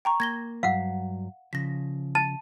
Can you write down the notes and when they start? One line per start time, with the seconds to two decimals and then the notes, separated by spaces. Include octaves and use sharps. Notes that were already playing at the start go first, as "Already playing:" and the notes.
0.05 G5 A#5 C#6
0.20 A#3 G#6 A#6 G7
0.63 G2 F#3 F5 F#5
1.53 C#3 F3 A#6 B6
2.15 A5 A6